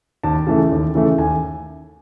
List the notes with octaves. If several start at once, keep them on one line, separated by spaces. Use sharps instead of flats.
D#2 A5
C#3 E3 A3
D#2
C#3 E3 A3
D#2 G#5